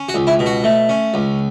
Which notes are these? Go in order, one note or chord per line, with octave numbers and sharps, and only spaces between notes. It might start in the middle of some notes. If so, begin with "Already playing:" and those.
Already playing: C#4
F#4
C#2
E4
B2
F#4
A3
C#4
C#2